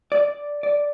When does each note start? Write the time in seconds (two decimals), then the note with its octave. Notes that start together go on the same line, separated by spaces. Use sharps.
0.12 D5
0.63 D5